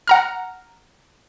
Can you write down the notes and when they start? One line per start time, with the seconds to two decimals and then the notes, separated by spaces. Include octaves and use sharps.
0.07 F#5 A#5 F6